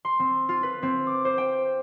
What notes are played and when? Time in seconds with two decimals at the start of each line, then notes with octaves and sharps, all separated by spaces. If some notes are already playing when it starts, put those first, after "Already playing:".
0.05 C6
0.19 C4
0.49 F4
0.63 B4
0.83 C4
1.07 D6
1.25 C5
1.38 G5